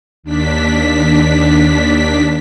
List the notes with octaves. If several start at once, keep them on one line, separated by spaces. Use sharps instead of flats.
D#2 D4 B6